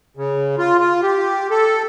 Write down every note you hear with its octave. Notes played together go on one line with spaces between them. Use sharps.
C#3
F4
F4
G4
A4